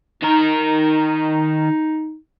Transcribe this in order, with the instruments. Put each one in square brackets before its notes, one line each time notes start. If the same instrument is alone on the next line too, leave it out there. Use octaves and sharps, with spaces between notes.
[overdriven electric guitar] D#3 A#4 [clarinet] D#4